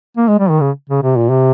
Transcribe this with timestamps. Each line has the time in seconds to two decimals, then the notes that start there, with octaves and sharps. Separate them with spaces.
0.17 A#3
0.28 G#3
0.39 G3
0.50 D#3
0.61 C#3
0.89 C#3
1.02 C3
1.16 A#2
1.29 C3